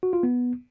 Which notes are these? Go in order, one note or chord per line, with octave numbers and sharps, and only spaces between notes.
F#4
F4
B3